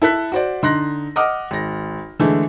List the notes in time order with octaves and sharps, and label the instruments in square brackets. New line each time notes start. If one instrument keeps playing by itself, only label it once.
[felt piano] E4 A4 F#6 B6
F#4 C5 D5
D3 D#4 C6 F#6 A#6
D#5 F#5 D6 D#6 F6
G#1 A#6
D3 E3 G#3 A3